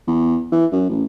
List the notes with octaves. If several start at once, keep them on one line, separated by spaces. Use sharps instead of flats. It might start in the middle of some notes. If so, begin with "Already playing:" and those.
E2
E3
F#2
A1